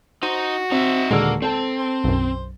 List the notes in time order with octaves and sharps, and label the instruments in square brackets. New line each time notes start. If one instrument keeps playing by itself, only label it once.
[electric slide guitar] D#4 [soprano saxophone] F#4 [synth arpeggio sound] C5
[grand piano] C4 [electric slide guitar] D#4 E5
[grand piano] D#1 D3 E6 [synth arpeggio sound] G#3 [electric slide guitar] A#3
[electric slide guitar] C4 [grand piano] A4 A5
[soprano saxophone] C5
[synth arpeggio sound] B1 F#2